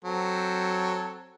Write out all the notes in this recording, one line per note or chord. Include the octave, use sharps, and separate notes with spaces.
F#3 C4 A4